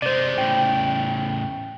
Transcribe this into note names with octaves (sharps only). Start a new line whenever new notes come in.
C3 G#3 C5 D5
A2 C#3 G5